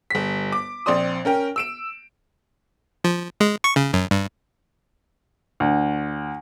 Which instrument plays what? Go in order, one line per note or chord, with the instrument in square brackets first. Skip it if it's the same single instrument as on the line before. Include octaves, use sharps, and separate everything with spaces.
[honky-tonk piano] G1 B6
D6
A#1 C4 D5 C6 D#6
C#4 A#4 G5
E6 D7 E7
[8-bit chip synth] F3
G#3
C#6
C#3
F#2
G2
[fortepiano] D2